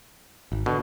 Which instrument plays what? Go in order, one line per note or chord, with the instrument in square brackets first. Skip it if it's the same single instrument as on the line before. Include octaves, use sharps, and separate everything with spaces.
[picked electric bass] G#1
[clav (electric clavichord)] B2 [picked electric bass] D3